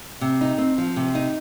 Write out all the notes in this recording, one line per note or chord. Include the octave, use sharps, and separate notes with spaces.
C3
D#4
C4
F3
C3
D#4